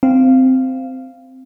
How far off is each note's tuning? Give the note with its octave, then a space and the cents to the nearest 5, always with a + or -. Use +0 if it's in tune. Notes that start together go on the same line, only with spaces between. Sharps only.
C4 -10 F5 -10